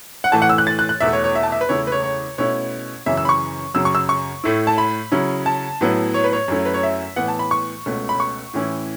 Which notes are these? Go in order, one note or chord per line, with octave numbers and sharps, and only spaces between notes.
F#5
A2 E3 A3 A5
F#5
E6
F#6
A6
F#6
F#6
E2 B2 A3 E4 E5
C#5
C#5
E5
A5
E5
B4
E2 C#3 A3 E4 C#5
B4
C#5
C#5
B2 A3 C#4 E4 C#5
F#2 C#3 E3 C#4 E5
E6
B5
C#6
F#2 C#3 F#3 E6
C#6
E6
C#6
A2 A3 E4
A5
B5
C#3 F#3 C#4 E4
A5
A2 F#3 B3 E4
C#5
B4
C#5
F#2 F#3 A3 C#4 E4
B4
C#5
E5
A2 E3 B3 F#5
A5
B5
C#6
C#2 B2 A3 C#4
B5
C#6
A2 E3 C#4 E4